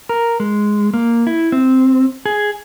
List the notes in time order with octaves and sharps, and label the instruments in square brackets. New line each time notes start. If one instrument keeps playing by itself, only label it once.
[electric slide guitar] A#4
G#3
A#3
E4
C4
G#4